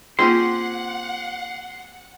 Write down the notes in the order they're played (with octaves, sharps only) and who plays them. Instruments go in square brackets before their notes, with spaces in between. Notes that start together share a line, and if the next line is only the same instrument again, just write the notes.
[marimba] A#3 F4 G#4 [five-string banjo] C4 C#4 G4 [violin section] F#5 [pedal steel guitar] C6